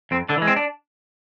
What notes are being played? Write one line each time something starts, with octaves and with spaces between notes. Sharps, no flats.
F2 C4
D3 D4
E3 G#3
C4
D4